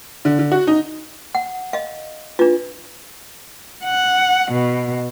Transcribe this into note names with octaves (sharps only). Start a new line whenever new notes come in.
D3
D3
F#4
D#4
F#5
D#5 F5
D4 F4 B4
F#5
B2